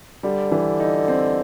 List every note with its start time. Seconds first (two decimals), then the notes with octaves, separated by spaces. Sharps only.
0.23 D3 G3
0.52 E3
0.80 D#4
1.08 C4